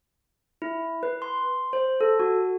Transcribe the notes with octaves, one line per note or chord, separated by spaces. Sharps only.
E4
B4
C6
C5
A4
F#4